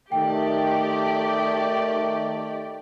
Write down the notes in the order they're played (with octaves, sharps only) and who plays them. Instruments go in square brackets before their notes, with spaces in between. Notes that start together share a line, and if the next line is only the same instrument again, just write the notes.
[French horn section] D#3 A3 [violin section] G4 D5 [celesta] G5